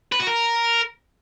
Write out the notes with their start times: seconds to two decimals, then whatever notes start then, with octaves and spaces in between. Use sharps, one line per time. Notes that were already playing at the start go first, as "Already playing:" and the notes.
0.12 B4
0.20 F#4
0.27 A#4